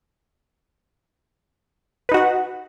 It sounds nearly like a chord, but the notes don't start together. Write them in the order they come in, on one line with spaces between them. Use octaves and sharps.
B4 D#4 F#4 F#5